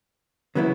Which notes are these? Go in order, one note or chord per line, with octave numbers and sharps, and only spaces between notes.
C#3 F#3 B3 E4